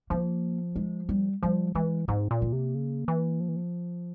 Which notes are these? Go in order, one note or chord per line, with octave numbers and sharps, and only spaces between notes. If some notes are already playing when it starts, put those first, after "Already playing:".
F3 A#3
G#3
G3
F3 G3
E3 G#3
G#2 C4
A#2
A#3
C3
C#3
E3
F3
E3
F3